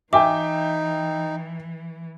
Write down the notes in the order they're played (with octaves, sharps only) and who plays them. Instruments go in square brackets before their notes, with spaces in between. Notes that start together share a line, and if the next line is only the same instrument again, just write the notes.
[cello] E3 [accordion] D#4 [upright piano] E5 G5 G#5 [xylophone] D6